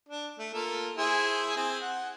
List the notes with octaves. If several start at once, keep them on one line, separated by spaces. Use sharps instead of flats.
D4
A3
A#3 F4 A4
E4 G#4 C5
C4 G#4
F#5